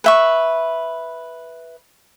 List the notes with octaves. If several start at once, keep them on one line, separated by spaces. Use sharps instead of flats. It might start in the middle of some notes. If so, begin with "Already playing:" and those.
B4 E5 C#6